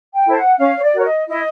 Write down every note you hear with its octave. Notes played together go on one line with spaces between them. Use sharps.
G5
E4 A4 C5
F#5
C#4 F5
C#5
D5
F#4 A#4 C#5
D#5
E4 D#5